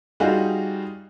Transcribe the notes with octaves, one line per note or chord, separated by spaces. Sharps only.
G3 D#4 F4 F#4 G#4